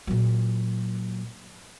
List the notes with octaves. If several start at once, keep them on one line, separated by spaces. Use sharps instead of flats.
A#2 F#3